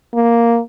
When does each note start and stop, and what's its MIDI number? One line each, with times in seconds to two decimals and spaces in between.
0.14 0.60 58